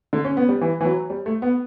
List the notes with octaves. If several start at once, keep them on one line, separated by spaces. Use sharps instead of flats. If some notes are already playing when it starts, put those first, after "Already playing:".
D3
C#4
B3
G3
E3
E3
F#3
G3
A3
B3